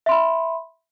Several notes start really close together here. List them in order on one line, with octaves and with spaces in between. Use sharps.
E5 C6 B5